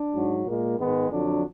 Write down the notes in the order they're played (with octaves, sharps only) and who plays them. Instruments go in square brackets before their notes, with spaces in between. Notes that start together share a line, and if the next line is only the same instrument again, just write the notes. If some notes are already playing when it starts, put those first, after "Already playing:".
Already playing: [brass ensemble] D4
G#2 F#3
A#2 G#3 A#3
G#2 D#3 G#3 B3
F2 D3 F#3 D4